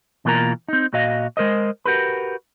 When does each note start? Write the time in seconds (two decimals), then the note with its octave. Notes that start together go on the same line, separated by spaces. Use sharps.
0.25 B2 E3 A#3 F4 A#4 A#5
0.68 C4 D#4
0.93 A#2 F#4 D#5 F5
1.37 G#3 A#4 C5 D#5
1.85 F#4 G4 A#4 B4